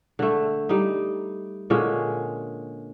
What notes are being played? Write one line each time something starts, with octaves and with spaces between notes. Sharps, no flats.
D3 A3
G3 D#4
A#2 D3 G#3 C#4